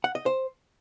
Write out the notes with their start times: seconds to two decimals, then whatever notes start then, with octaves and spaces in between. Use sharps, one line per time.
0.04 F#5
0.15 D#5
0.26 C5